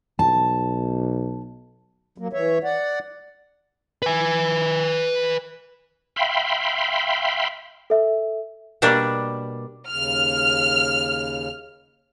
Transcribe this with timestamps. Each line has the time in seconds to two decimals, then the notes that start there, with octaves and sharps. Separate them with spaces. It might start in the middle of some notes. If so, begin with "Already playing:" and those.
0.19 B1 A5
2.18 F#3 A#3
2.33 E3 C#5 E5
2.64 D5 F#5
4.02 B4 G#5
6.16 E5 F5 G5 B5 C6
7.90 A4 E5
8.82 B2 G3 A#3 D4
9.89 D#2 C#3 F6